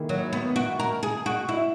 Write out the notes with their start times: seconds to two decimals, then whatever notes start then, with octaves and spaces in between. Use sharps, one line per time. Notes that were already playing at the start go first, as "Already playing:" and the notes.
Already playing: D#3 A#3 E4 G#4
0.09 F#3
0.33 B3
0.56 F#4
0.80 A#4
1.03 G#4
1.26 F#4
1.49 E4